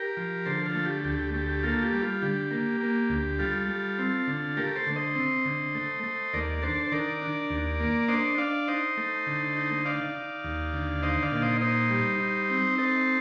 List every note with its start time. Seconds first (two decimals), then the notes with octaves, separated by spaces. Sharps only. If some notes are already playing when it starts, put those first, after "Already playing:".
Already playing: G4 A#4
0.17 F3
0.45 D3 A4 C5
0.66 F4 A4
0.75 A3
0.85 G4
1.04 D2 G4
1.19 G4
1.34 A3 G4
1.49 G4
1.63 A#3 F4 A4
1.78 A4
1.82 G4
1.93 G3
2.02 F4
2.22 D3 G4
2.51 A#3
2.81 A#3
3.10 D2
3.39 G3 F4 A4
3.69 G3
3.99 C4
4.28 D3
4.57 A3 G4 A#4
4.76 A4 C5
4.87 D3
4.96 C5 D#5
5.15 C4
5.45 D3
5.75 A3
6.04 A3
6.33 D#2 A#4 D5
6.62 D4 A4 C5
6.87 C5
6.92 D#3 A#4 D5
7.22 D4
7.50 D#2
7.80 A#3
8.08 D4 C5 D#5
8.38 D4 D5 F5
8.68 D#4 C5 D#5
8.97 A3
9.27 D3
9.56 D#4
9.85 D#4 D5 F5
10.14 D#4
10.44 D#2
10.73 D3
11.02 D#4 C5 D#5
11.22 D5 F5
11.32 A#2
11.42 C5 D#5
11.61 D#4 C5 D#5
11.90 G3
12.19 D#4
12.50 C4
12.78 D#4 A4 C5